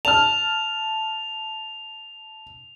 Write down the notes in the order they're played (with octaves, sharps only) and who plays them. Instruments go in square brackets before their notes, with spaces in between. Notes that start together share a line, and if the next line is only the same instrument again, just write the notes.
[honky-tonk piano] A5 F6 [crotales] F7